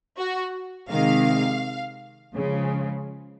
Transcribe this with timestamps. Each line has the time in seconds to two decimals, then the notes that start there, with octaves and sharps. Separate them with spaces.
0.17 F#4
0.90 C3 D#3 G#3 F5
2.35 C#3 F3 G#3